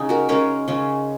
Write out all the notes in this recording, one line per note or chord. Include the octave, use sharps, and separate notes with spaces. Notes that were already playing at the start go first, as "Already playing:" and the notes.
Already playing: C#3 C#4 D#4 G#4
F#4 A#4
C#3 G#3 C#4 A#4 C#5
C#3 G#3 C#4